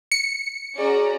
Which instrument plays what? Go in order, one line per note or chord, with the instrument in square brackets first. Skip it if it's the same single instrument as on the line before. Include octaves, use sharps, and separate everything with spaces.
[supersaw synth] C#7
[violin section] C#4 F#4 A#5 [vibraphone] G#4 [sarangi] D5